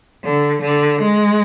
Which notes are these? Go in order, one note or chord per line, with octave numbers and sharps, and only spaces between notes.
D3
D3
G#3